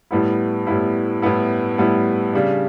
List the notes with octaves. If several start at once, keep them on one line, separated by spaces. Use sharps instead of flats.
A2 G3 B3 E4
A2 G3 B3 E4
A2 G3 B3 E4
A2 G3 B3 E4
C#3 G3 D4